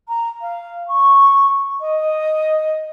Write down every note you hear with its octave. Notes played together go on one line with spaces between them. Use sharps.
A#5
F5
C#6
D#5